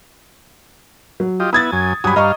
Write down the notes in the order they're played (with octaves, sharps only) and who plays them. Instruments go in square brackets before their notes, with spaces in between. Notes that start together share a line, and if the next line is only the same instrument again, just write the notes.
[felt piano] F#3
[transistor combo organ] F4 G4 D#5
[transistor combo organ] B3 E4 [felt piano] D#6 G#6 A6
[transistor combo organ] F#2 G#5
[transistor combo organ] G2 F#3 G#5 [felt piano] B5 D#6
[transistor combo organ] G2 F5 [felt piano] D#5 A#5 C#6